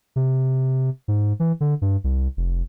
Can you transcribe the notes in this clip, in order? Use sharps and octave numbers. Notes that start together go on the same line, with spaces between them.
C3
G#2
E3
D3
G2
C2
F1